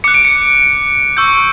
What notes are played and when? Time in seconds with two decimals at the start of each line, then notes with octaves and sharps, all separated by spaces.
0.04 D6 F#6 C#7
0.14 D7
0.25 C#7
1.17 C#6 E6 G6